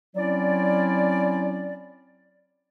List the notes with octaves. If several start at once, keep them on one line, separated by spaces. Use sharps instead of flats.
F#3 C4 C#4 E4 D5